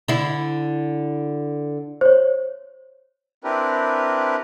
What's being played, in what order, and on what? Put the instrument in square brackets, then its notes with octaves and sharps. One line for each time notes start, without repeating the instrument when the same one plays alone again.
[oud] D3 E4
[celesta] C5 C#5
[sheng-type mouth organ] C4 D4 E4 G4 A#4 B4